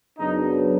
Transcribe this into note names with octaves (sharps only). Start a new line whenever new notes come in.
F#2 C#3 F#3 B3 D4 D#4